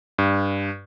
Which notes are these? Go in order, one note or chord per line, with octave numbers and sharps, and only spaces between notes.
G2